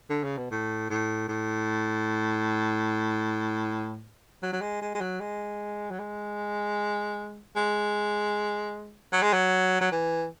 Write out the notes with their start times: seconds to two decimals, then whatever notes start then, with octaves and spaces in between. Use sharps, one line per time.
0.10 D3
0.23 C#3
0.37 B2
0.51 A2
0.90 A2
1.28 A2
4.42 F#3
4.52 F#3
4.61 G#3
4.82 G#3
4.94 G#3
5.00 F#3
5.20 G#3
5.91 F#3
5.99 G#3
7.56 G#3
9.12 F#3
9.22 G#3
9.33 F#3
9.81 F#3
9.92 E3